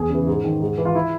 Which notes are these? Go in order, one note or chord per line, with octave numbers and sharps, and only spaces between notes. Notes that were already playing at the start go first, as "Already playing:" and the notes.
Already playing: E2 G#4
C#3 E3
G#2
D#3
G#2
E3
F4
E4